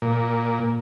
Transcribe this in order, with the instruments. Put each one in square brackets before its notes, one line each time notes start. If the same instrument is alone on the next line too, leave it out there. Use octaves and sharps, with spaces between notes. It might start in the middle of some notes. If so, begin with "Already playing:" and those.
[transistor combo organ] A#2